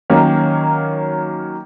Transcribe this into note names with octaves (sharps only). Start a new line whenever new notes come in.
D#3 F#3 A#3 C#4